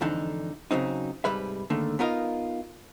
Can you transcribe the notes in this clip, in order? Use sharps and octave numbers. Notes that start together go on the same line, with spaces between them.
F2 G#2 D3 E3 D4 D#4
C#3 F#3 C4 D#4
C2 G#2 G3 B4 E5
G#2 D3 D#3 A3 A#3
B3 D#4 F4 A#4 D#5 F5